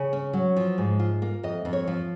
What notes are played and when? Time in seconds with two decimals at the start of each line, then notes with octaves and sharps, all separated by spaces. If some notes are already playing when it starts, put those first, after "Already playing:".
Already playing: C#3 C#5
0.13 C#4
0.33 F#3
0.57 F3
0.78 G#2
0.99 F4
1.22 A#3
1.43 F2 D#5
1.65 F2
1.73 C#5
1.87 F3